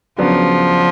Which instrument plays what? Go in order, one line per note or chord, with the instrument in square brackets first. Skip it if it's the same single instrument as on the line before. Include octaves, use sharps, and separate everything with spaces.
[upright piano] C#3 F#3 B3 D4 [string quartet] F3